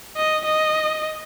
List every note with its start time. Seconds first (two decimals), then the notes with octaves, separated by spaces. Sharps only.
0.17 D#5
0.45 D#5